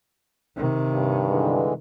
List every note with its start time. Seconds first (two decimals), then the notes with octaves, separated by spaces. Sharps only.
0.56 C3 D#3
0.94 G2
1.29 D3 E3 G#3